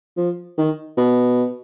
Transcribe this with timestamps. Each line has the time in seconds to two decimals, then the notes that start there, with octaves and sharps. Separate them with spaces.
0.17 F3
0.58 D#3
0.97 B2